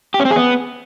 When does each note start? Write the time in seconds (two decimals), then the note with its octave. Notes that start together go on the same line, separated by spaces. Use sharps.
0.14 G4
0.20 C#4
0.25 C4
0.31 G#4
0.36 B3